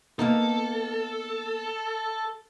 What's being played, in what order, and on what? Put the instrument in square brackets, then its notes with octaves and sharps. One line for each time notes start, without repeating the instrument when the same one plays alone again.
[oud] A#3 B3 D#4 [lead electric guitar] A4